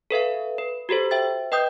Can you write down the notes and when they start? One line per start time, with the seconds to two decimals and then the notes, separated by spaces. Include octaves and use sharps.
0.11 A4 B4 E5 F5
0.58 B4
0.89 F#4 G4 A4 C5
1.11 C5 E5 G5 A6
1.52 B4 D#5 G5 D#6 G6